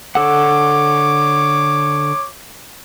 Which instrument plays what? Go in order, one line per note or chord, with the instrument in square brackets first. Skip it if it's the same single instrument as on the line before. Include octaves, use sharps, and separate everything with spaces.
[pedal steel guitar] D3 A4 F#5 [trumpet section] C#5 D6